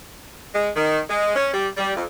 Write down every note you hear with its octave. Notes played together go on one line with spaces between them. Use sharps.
G#3
D#3
G#3
C#4
G3
G3
F2